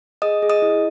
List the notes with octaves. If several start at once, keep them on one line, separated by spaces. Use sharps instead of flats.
G#4 D#5 D#6
G#4
D#5 D#6
E4